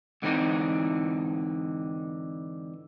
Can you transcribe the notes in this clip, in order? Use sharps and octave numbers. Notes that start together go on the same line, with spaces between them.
G#2 D3 E3 C4 D#4